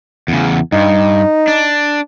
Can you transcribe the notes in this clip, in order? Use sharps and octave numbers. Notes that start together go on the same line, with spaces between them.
E2 C#3
G2 D#4
D4